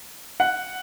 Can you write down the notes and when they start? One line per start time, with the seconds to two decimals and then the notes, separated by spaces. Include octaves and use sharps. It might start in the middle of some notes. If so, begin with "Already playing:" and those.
0.40 F#5